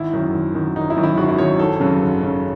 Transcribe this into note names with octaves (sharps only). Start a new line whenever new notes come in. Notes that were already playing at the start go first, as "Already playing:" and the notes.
Already playing: G#1 E4
F#2 D#3
G#1
F#2 D#3
G#1 D#4
E4
F#2 D#3
E4
G#1 F#4
E4
F#2 D#3 C#5
G#1 A4
F#2 C#3
G#1
F#2 C#3